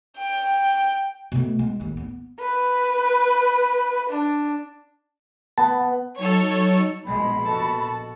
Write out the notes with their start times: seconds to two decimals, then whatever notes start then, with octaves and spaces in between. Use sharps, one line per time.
0.17 G5
1.32 B2 A3
1.59 G#3
1.80 A1 D#2
1.97 B3
2.39 B4
4.09 D4
5.58 B3 A5
6.17 F#3 D#4 A4 C#5 C#6
7.06 A#1 B2 G#3 B5
7.45 F#4 A4 A5